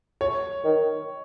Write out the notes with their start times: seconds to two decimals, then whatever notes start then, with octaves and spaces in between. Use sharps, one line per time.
0.21 C#5
0.64 D#3